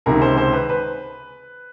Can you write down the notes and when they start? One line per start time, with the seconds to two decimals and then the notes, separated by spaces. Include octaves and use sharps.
0.06 C#2 C3 D#3 A#4
0.21 C5
0.37 C5
0.53 B4
0.69 B4